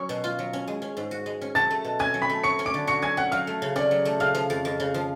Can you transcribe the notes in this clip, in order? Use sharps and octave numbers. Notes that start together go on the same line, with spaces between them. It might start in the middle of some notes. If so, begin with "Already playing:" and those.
Already playing: F#3 C#4 C#6
B2
F4
F#3
C#4
G#3
C#4
G#2
F#4
G#3
C#4
F#3 A5 A6
A3
B2
C#4 G#5 G#6
F#3
B5 B6
A3
F#3 C#6 C#7
C#4
D6 D7
D3
F#4 C#6 C#7
F#3 G#5 G#6
C#4 F#5 F#6
F#3 F5 F6
A3
C#3
C#4 D5 D6
F#3
A3
C#3 F5 F6
F3
F2
F2
C#3
F3